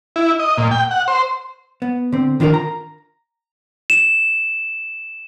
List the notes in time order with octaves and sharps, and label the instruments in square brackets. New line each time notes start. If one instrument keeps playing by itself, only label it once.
[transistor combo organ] E4
D#5
A#2
G5
F#5
C5
[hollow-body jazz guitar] B3
D3 C4
D#3 D4 F4 G4 A#4
A#5
[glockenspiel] E7